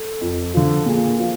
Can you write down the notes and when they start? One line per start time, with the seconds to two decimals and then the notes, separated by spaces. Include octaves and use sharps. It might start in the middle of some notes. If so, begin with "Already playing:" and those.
Already playing: A4
0.21 F2
0.54 D3 F3
0.86 A#2 G#4
1.20 F3